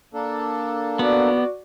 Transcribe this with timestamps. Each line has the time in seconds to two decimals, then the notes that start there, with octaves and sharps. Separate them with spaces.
0.14 A#3 D4 A4
0.99 B3 F#4 D5